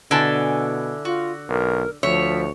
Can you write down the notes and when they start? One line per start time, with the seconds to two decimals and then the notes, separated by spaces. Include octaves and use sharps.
0.11 B2 D3 E4 G#5 A5
1.05 F4 F#4
1.49 B1 A#4
2.03 D2 F3 C#5 E5